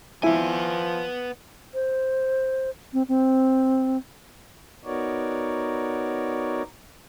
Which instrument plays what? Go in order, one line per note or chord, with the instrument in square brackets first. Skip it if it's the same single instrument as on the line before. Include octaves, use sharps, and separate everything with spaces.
[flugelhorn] F3 [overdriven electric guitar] B3 G#5 [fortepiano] E4
[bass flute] C5
C4
C4
[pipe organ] B3 D#4 F#4 A#4 C#5 D5